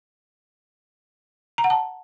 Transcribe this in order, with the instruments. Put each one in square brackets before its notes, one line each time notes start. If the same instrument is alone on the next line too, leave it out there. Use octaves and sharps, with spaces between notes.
[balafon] A#5
F#5
A5